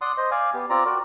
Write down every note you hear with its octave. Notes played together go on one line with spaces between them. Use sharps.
D5 F#5 C6 D#6
C5 D#5
D5 F5 G#5
B3 G4
C4 F4 D5 A#5
F#4 A#4 D5